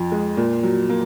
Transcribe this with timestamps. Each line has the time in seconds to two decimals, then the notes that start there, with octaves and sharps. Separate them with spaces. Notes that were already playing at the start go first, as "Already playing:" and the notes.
Already playing: F2 F3
0.12 G#3
0.37 A#2
0.63 F#3
0.90 A#3